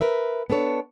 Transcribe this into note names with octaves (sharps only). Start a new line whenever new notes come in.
A#4 B4 E5
B3 D4 A4 C#5